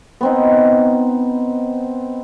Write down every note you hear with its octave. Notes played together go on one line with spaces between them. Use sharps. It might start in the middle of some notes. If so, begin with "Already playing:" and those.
B3 C4 D#4